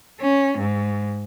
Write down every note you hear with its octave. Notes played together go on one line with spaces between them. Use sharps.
C#4
G#2